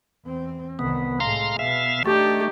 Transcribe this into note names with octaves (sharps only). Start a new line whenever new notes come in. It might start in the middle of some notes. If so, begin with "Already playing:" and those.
E2 C4
C2 D#3 B3
A2 G#3 F5 A#5 C6
B2 B3 E5 F5
A3 D4 D#4 G4